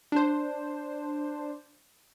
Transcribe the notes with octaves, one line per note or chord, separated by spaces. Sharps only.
D4 C5